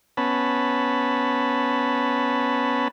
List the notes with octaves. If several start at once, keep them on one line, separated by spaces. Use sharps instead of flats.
B3 C#4 A5 B5